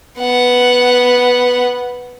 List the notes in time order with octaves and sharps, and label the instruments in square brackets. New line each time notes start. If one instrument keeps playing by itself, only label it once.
[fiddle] B3 F#5